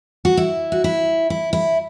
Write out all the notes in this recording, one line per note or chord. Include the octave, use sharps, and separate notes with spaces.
F#4
E4
F#4
E4
E4
E4